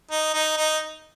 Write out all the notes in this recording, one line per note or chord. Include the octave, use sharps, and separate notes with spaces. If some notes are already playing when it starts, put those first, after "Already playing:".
D#4
D#4
D#4